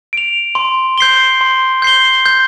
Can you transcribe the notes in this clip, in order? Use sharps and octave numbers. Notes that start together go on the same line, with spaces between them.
D7 F7
C6
G6 C7 G7
C6
G6 C7 G7
G6